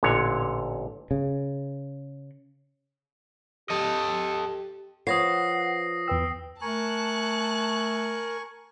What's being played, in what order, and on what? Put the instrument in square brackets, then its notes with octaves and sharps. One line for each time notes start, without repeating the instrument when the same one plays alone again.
[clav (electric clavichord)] A1 A#2 D3 C#5
[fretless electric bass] C#3
[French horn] G4 [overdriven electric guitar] A4 D#5
[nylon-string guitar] F3 B4 C#5 [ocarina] F#5 [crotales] D#6 A#6 C7
[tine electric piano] E2 B4 E6 [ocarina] G5
[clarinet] A3 [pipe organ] A#4 [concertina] G#5 C#6 [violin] A5 F#6